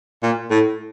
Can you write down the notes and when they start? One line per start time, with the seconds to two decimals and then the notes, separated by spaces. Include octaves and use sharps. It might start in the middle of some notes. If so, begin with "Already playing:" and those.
0.23 A#2
0.51 A2